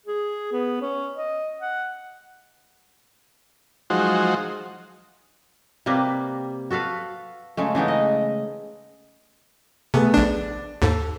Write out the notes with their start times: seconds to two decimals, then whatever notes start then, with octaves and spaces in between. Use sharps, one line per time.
0.06 G#4
0.52 B3
0.81 C#4
1.17 D#5
1.61 F#5
3.90 F3 F#3 G#3 D#4 F#4 C5
5.86 C3 G3 A#3 B4
6.70 F#4 A4 B4 F5
7.57 C#3 G#3 A3
7.75 C#3 E3 B3 D#4
7.88 D#5
9.94 C3 A3 B3 G#4
10.14 A#1 D4 D5
10.82 D#2 G#2 A4